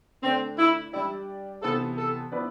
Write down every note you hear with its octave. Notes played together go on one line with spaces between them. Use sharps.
D3 A3 C4 D4
E4
G3 D4 E4 G4 D5
C3 E3 B3 F4 A4 C5
A4
F3 B3 E4 B4 D5